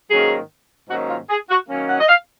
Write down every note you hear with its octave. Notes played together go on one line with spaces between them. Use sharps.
G#2 D#3 F#3 A#3 C#4 G#4
G#2 D#3 F#3 A#3 C#4 F#4
F4
G#4
F#4
D#3 F#3 A#3 C#4
F#5
D#5
F5